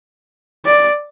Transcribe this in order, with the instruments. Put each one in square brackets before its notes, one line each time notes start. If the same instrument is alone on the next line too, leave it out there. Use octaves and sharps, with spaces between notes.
[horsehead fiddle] D5